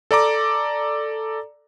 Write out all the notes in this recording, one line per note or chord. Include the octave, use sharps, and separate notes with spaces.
A4 D5 A#5 D6